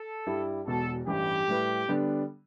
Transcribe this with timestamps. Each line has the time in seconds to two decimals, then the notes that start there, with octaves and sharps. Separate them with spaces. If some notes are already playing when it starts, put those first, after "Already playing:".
Already playing: A4
0.27 G2 G3 E4
0.67 E1 E2 B2 A4
1.07 A1 G2 E3 G4
1.48 A2 G3 E4 B4
1.88 D3 G3 B3 D4